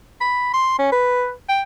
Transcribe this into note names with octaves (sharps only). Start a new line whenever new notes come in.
B5
C6
C#4
B4
G5